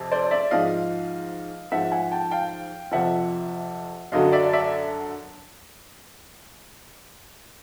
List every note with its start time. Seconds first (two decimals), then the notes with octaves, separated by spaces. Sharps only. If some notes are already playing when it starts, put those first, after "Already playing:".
Already playing: F2 C3
0.11 C5 D5
0.31 D5 E5
0.51 G#2 F3 D#5 F5
1.72 G#2 F3 E5 F#5
1.91 F#5 G#5
2.11 G5 A5
2.31 F5 G5
2.91 F2 C3 F3 E5 F#5
4.12 F#2 D3 F#3 D#5 F5
4.32 D5 E5
4.53 D5 E5